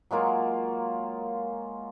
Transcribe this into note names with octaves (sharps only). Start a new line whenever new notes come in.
F#3 G#3 A#3 F4